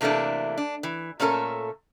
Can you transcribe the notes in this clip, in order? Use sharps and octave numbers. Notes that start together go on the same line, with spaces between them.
C3 E3 A3 A#3 D4
D4
E3
A#2 A3 C#4 A4 A#4